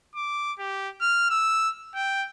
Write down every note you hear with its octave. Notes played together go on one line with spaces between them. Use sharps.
D6
G4
F6
E6
G5